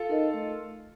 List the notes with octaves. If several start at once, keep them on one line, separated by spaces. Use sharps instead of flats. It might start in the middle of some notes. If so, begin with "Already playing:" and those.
Already playing: F4 A4
D#4 A#4 D#5
A3